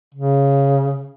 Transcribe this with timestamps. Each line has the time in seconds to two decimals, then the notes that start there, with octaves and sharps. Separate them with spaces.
0.15 C#3